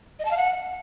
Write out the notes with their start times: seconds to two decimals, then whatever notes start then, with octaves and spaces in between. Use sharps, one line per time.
0.19 D#5
0.25 A5
0.31 F5
0.37 F#5